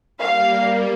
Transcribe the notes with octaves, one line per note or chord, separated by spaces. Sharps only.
G3 A#3 F5